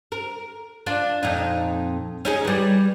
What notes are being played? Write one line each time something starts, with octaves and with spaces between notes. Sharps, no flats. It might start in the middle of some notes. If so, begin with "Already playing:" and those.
A#4
D4 F4 D5
F2 A#2 D#4
C#4 D#4 G#4
E3 G3